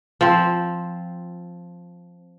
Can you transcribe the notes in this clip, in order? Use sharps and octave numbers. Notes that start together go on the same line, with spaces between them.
F3 C4